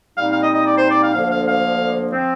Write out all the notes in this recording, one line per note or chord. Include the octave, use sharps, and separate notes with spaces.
A#2 G3 C4 D#4 F5
F5
D#5
D#5
D5
C5
D5
F5
D2 D3 F3 A#3 F5
F5
F5
F3 C4